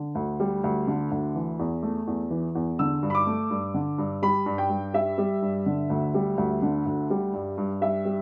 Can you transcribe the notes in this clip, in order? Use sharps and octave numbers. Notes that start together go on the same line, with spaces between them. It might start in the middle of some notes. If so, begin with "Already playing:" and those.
Already playing: D3
D2
G3
D2
D3
D2
E3
E2
A3
E2
E3
E2
D3 E6
G2
B5
D6
A3
G2
D3
G2
G3 B5
G2
G5
G2
G3 E5
G3
G2
D3
D2
G3
D2
D3
D2
G3
G2
G2
G3 E5
G3